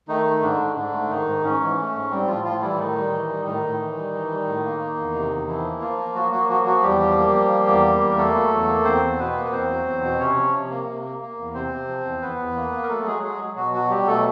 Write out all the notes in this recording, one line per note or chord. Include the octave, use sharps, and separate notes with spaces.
D#3 A3 D#4
A3
G#2 D3 D4
G#2
G#2 D3 D4
A3
G#2 D#3 D#4
G#2
G#2 C#4
E3
A3
G#2
G3 C4
A2 F3 F4
A2 F3 F4
E3 G3 E4
A2 D#3 D#4
G3
E3
G3
A2 D#3 D#4
A2
E3
G3
E3
G3
A2
A#3
A#3
E2
C3
E2
E3 F3 E4
A#3
F3 F4
A#3
F#3 A#3 F#4
F#3 A#3 F#4
F3 F#3 F#4
F3 F#3 F#4
E2 G3 G4
F3
A#3
F3
A#3
E2
A#3
E2
A#4
A3 A#3 A4
F#3
E2
A#3
E2 C4 C5
E2
B2 B3 B4
A#3
B4
E2 C4 C5
F#3
E2
B2
C3 C#4 C#5
F3
C3
A#3
C3
A#3
A#3
E2
C3 C4 C5
C3
F3
E2
E2 B3 B4
E2
A#3
A#3
A#4
F#3 A3 A4
F#3 G#3 G#4
F#3 G#3 G#4
F#3
B2 F#3 F#4
F#3 F#4
F#3 G3 G4
B2 A3 A4